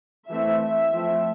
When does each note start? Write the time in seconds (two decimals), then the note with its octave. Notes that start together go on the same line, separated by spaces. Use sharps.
0.30 E3 A3 C4 E5
0.61 E5
0.92 F3 A3 C4